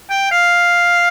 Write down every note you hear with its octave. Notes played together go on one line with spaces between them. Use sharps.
G5
F5